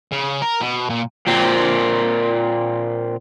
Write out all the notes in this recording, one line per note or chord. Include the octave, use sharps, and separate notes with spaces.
C#3
A#4
B2
A#2
A#2 C4